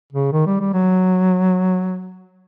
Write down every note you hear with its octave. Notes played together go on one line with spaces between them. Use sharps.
C#3
D#3
G3
G3
F#3